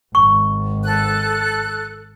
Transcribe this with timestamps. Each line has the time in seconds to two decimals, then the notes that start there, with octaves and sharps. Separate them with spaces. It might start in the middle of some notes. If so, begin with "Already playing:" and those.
0.15 G#1 C#6
0.84 A4 F#6